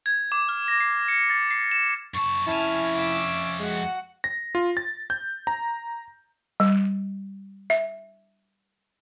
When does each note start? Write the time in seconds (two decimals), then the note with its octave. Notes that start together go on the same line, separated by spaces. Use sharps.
0.06 G#6
0.32 D6
0.49 F6
0.68 A#6
0.80 C7
1.08 C#7
1.30 A6
1.51 C7
1.71 E7
2.14 F#2 A5 C#6
2.47 F2 C#4 E4 G#5 A5 F6
2.95 E5 D6
3.59 G#3 F#4 F#5
4.24 A#6
4.55 F4
4.77 A6
5.10 G6
5.47 A#5
6.60 G3
7.70 E5